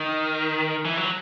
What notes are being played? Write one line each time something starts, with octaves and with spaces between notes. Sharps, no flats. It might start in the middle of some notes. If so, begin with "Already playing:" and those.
Already playing: D#3
E3
F#3